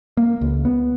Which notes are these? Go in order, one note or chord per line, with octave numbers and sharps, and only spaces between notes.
A#3
C#2
B3